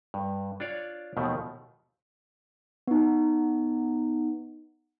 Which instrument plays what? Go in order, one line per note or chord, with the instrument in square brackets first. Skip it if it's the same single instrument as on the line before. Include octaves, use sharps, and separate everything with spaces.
[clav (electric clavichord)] G2
D4 F4 C#5 D5 F5
D#2 B2 D#3 F3 A3
[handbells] B3 D#4